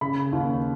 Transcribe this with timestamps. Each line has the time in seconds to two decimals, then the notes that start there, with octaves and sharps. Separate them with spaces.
0.01 C#3 B5
0.33 D#2